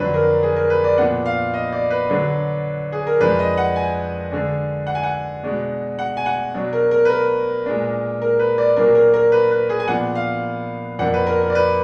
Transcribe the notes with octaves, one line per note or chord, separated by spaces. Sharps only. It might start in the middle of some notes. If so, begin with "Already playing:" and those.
Already playing: F2 D3 F#3 D4 B4
A#4
G#4
A#4
B4
D5
A#2 F3 B3 D4 F#5
F5
D#5
D5
B4
D3 F#3 D4
G#4
A#4
F2 F3 G#3 D4 B4
D#5
F#5
G#5
D3 G#3 D4
F#5
G#5
F#5
B2 G#3 D4
F#5
G#5
F#5
B2 F#3 D4
A#4
A#4
B4
A#4
A#2 G#3 D4
A#4
B4
D5
A#2 F#3 A#3 D4 A#4
A#4
A#4
B4
B4
G#4
G#5
A#2 F3 B3 D4 F#5
F5
F2 F3 A#3 D4 F#5
B4
A#4
A#4
D5
B4